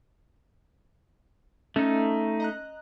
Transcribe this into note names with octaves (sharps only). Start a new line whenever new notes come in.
A3 C#4 D#4
D#5 A#5 F#6